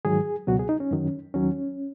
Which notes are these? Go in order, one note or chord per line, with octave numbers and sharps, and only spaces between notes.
G#2 D#3 F#3 G#4
C#2 B2 F#3 F#4
G#4
D#4
C#4
F#2 D#3 F#3
D#2 D#3 F#3 C#4